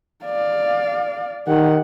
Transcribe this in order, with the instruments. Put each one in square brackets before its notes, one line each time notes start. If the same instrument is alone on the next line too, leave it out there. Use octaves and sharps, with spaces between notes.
[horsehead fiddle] D5 F5
[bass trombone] D#3 [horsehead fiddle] G4 F#5